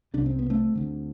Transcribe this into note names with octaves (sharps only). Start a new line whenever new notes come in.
C2 C3 D4
C4
B3
A3 C4
D2 D3